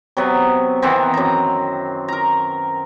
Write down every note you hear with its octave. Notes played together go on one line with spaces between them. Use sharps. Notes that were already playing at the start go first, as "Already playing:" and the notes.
C3 F#3 B3
D#3 E3 B3 C4
F#2 A#5
A#4 A#5